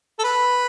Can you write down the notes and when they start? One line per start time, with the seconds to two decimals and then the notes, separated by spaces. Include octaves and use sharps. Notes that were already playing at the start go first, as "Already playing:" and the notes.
0.19 A4
0.24 B4